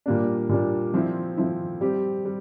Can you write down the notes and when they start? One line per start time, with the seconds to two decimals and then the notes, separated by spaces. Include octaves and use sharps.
0.06 A#2 G3 A#3 D4
0.49 A#2 G3 A#3 D4
0.94 F3 C4 E4
1.37 F3 C4 E4
1.81 G3 C4 G4
2.25 G3